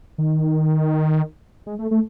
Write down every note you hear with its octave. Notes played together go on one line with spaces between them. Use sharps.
D#3
G#3
A3
A3